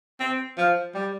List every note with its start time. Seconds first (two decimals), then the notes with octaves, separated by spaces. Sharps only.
0.20 C4
0.57 F3
0.94 G3